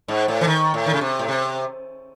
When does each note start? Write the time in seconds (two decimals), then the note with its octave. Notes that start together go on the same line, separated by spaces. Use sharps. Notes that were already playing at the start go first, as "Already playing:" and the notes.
0.08 G#2
0.28 A2
0.41 E3
0.47 D#3
0.74 A2
0.86 D#3
0.94 C#3
1.01 C3
1.19 A2
1.28 C3